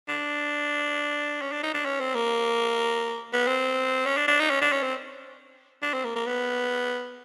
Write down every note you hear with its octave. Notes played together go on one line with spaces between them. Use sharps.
D4
C#4
D4
D#4
D4
C#4
C4
A#3
B3
C4
C#4
D4
D4
D#4
C#4
D4
C#4
C4
D4
C4
A#3
A#3
B3